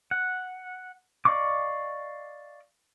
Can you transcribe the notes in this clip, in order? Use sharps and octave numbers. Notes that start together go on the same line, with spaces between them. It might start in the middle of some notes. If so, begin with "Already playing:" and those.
F#5
D5 D#5 F5 C#6 D6